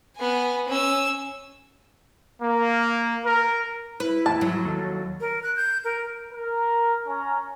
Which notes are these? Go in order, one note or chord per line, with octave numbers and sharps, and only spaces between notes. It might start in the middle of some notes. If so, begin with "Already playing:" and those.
B3 G#5
C#4 E6
A#3
A#4
E4 B4
E2 A2 A5
G#2 F3 F#3
D#2 A4
A#4
F#6
G6
A#4
A#4
C#4 A#5